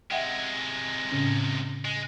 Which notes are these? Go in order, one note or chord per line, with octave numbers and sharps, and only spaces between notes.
C3 G#3 E5 F#5 G5
A2 C#3 C#4
G#3